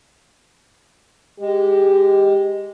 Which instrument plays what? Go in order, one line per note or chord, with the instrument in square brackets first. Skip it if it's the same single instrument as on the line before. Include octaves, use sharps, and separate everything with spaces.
[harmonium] G#3 [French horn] G4